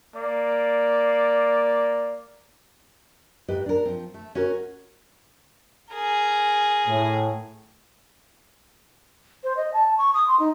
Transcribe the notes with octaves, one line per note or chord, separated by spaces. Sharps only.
A#3 D5
G#2 G4 B4 D#5
D4 A#4
F3 C4
A3
C#4 F#4 A#4 C#5
G#4 A#4
A2
C5
D#5
A5
C#6
D#6
C6
D#4